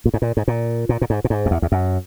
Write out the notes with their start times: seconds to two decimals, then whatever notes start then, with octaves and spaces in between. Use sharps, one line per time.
0.05 A#2
0.14 G#2
0.22 A#2
0.37 G#2
0.48 A#2
0.89 A#2
1.01 A#2
1.10 G#2
1.24 A#2
1.30 G#2
1.46 F#2
1.51 E2
1.62 E2
1.72 F#2